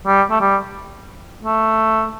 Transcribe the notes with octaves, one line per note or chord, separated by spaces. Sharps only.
G3
A3
G3
A3